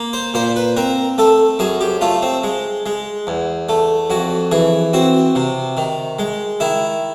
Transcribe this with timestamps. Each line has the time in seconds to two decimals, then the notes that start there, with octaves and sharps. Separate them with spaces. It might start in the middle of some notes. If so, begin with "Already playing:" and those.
Already playing: A#3
0.13 C5
0.34 A#2 C5
0.56 B4
0.77 C4 A#4
1.18 A3 A4
1.59 F#2 G#4
1.81 G4
2.01 A3 F4
2.22 C4
2.44 G#3
2.86 G#3
3.27 E2
3.69 A3
4.10 F2 F#4
4.52 E3 G#4
4.93 C4 F#4
5.35 C3
5.77 D#3
6.19 G#3
6.60 D#3 E4